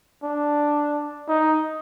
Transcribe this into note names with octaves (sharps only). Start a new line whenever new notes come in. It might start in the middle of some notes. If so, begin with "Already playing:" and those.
D4
D#4